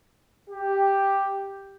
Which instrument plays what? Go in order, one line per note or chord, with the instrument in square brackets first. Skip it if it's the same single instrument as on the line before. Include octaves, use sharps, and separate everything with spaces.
[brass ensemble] G4